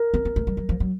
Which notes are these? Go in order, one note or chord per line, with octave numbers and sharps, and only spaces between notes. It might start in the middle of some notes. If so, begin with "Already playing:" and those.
Already playing: A#4
B3
B3
A3
G3
F#3
F3
F#3